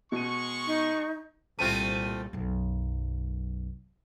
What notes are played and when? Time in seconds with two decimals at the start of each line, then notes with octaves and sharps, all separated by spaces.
0.12 B2 G#3 C#6 D#7
0.67 D#4
1.59 C2 A#2 A3 C4 F4 D#7
2.33 B1 F#2